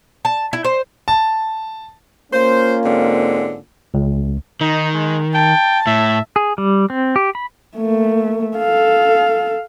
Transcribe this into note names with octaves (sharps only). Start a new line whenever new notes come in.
A5
E4
C5
A5
A#3 C#4 F4 C5
G#2 D3 C4
C#2
D#3 D#4
G#3
G5 A5
A2 E5
G#4
G3
C4
G4
B5
A3 A#3
A4 F5